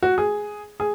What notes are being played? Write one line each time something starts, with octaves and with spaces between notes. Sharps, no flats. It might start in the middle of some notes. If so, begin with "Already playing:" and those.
F#4
G#4
G#4